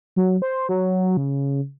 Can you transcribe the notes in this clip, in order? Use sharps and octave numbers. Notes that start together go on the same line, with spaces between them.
F#3
C5
F#3
C#3